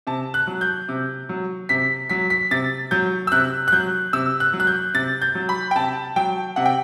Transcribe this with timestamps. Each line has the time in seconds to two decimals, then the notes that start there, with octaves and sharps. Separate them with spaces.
0.07 C3 A5
0.34 F#6
0.47 F#3
0.61 G6
0.89 C3
1.29 F#3
1.69 C3 B6
2.10 F#3 B6
2.30 B6
2.51 C3 A6
2.91 F#3 G6
3.27 E6
3.32 C3 F#6
3.68 F#6
3.72 F#3 G6
4.13 C3 E6
4.40 F#6
4.53 F#3
4.60 F#6
4.67 G6
4.94 C3 A6
5.22 G6
5.35 F#3
5.49 B5
5.71 G5
5.75 C3 A5
6.16 F#3 G5
6.56 C3 F#5
6.65 G5